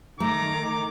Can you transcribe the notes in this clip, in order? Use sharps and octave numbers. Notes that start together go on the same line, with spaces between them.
D#3 A3 A#5 D6